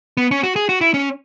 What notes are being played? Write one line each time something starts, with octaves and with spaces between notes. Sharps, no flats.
B3
C#4
F#4
G#4
F#4
E4
C#4